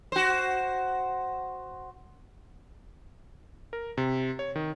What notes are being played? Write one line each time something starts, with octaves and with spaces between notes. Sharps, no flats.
F#4 C5
A#4
C3
C#5
D#3